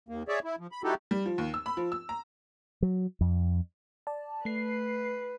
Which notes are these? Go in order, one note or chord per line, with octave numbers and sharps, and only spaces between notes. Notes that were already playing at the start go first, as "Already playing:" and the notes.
D#2 A#3
G#4 C#5 D5 E5
E4
F3
B5
G3 D#4 E4 F#4 G4 A4
G3
F3
D#2
E6
B5
F3
E6
A#5
F#3
F2
D5 A5
A3 B4 C7